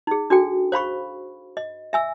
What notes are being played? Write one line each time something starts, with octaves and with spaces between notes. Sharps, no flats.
D#4 G#4
D4 F#4 A4 G5
C5 F5 B5 C#6
D#5
E5 G#5 E6